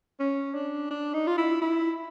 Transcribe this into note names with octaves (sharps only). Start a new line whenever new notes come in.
C#4
D4
D4
D#4
F4
E4
E4